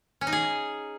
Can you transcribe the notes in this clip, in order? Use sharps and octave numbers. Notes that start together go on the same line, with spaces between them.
C#4
D#4
G#4